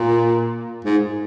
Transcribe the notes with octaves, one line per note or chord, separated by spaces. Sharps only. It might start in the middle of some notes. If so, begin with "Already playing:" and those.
Already playing: A#2
G#2